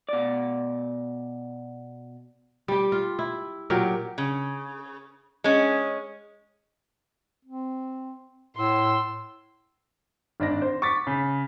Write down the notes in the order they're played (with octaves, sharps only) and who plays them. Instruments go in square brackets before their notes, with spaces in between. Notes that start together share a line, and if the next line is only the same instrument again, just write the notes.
[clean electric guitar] B2 D5
[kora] G3 G4
F4
E4
A#2 F#3 G4 A#4
[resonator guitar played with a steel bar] C#3
G#3 C#4
[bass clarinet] C4
[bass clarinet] A2 [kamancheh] C6 E6
[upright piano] G#1 D4 D5 A#6
C5
C#6 D6 A6 B6
C#3